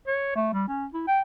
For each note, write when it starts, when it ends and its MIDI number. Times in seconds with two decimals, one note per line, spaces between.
0.07 0.33 73
0.35 0.51 57
0.53 0.66 55
0.68 0.86 61
0.93 1.02 64
1.07 1.21 79